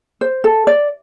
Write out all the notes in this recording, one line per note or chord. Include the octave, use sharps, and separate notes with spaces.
C5
A4
D5